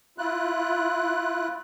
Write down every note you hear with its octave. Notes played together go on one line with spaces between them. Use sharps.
E4 F4 F#6